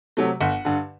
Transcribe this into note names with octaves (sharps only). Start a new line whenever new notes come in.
C3 F#3 A3
G1 F#5
G2 D3